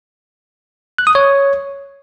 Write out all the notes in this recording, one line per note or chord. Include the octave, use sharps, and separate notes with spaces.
F#6
D#6
C#5